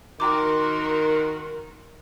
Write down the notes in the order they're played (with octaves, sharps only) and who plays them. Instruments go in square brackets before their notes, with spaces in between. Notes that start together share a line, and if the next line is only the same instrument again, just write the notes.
[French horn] D#3 [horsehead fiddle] F#4 A#4 [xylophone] G5 A#5 D6 [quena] C6